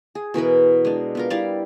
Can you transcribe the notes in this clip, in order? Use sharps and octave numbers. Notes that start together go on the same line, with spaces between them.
G#4
B2 E3 A#4 B4
G#3 D4
B3 F4 A#4
G3 E4 D5 F5